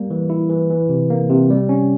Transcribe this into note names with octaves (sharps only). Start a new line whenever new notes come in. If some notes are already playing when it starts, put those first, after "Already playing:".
Already playing: G3 A#3
E3
E4
E3
E3
C3
A#3
C3
G3
C#4